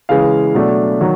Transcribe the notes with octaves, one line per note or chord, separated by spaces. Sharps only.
C#3 E3 G#3 F5
B2 F#3 A3 D4
D#3 F#3